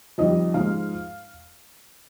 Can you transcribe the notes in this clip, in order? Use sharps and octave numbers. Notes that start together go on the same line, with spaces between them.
F2 D#3 G3 D#5
G#2 F3 G#3 F5